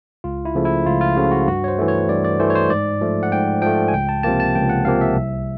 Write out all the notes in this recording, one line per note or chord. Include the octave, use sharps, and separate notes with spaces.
C#2 F4
E4
C#3 F3 A3
E4
C#2 F4
F4
C#3 F3 A3 F#4
F#4
G2 F#4
C#5
C5
E3 A3
C#5
G2 D5
D5
E3 A3 C5
C#5
C5
G#2 D5
F3 A3
F#5
G#2 G5
F3 A3 G5
G#5
C#2 G5
A5
C3 F3 A#3 A5
A5
C#2 G5
F#5
C3 F3 A#3 F5
E5
C2